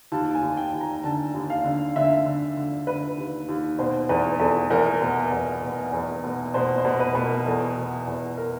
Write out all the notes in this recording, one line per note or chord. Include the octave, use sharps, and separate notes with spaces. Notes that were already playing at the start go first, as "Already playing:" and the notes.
D#2 A5
G#5
D#2
G5
D#2
A#5
D3 A5
D#2
F5
D3
D3 E5
D3
D3
D3 B4
D#2
D#2
B2 C5
E2 B4
E2 A4
E2 A#4
B2
E2
B2
E2
B2
B2 C5
C5
B2
B4
B2 B4
A#4
E2 A4
B2
E2
A#4